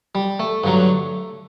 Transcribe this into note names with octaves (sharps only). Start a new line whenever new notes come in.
G3
A3
G2 D3 F#3